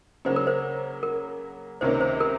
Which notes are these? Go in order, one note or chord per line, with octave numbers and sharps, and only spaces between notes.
C#3 F#3 A#3 C#4 C5
A#4
C5
A#4
C#2 C3 D#3 A#3 C#4 C5
C5
A#4